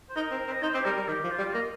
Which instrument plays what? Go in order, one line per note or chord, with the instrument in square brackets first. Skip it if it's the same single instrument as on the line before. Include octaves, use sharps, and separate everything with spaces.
[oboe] C5
[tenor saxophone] D#4 [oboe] A#4
[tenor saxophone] C4
C4
[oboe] D#5
[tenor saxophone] D#4 [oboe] C5
[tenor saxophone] C4 [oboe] G4
[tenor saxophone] G3 [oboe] A#4
[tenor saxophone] G3
[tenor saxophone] D#3 [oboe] G4
[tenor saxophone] F3
[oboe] F4
[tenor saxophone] G3
[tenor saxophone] A#3 [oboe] D#5